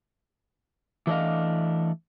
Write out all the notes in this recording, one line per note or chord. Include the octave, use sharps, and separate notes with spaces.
E3 A3 D4 C#5 D#5 F5